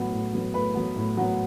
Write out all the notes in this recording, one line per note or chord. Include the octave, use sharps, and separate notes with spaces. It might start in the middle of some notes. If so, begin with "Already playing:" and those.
Already playing: A2 F#3 B3
A2
F#3 B3
A2 B4
F#3 B3
A2
F#3 B3